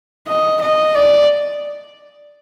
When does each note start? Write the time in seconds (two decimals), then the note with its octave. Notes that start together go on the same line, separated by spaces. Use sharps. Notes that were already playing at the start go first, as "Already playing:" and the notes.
0.27 D#5
0.61 D#5
0.94 D5